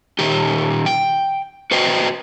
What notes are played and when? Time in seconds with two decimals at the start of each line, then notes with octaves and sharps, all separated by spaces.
0.19 A#2 D#3 G4
0.86 G5
1.71 F#4 B4 C5 D#5 G5